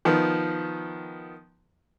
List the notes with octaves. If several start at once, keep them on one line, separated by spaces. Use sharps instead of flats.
D#3 F3 B3